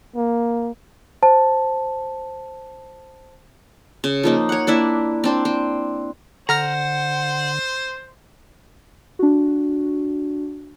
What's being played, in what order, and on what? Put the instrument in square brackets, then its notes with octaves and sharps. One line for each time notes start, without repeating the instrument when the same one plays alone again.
[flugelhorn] A#3
[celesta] C5 A5
[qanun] C#3
F3 A#3 D#4
C#5 F#5
A#3 D4 E4 E5
C4 D4 C5
C4
[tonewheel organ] D3 [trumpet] C5 [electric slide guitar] F#5 [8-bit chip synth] A#5 F6 A#6
[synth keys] D4 F#4